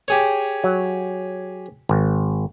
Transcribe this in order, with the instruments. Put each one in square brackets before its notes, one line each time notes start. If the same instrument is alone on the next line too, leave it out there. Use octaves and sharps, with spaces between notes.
[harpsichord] G4 G#4 C#5
[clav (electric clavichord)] F#3
G#1